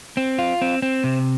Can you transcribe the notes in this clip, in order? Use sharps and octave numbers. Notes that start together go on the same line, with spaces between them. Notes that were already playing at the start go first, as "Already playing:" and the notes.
C4
F4
C4
C4
C3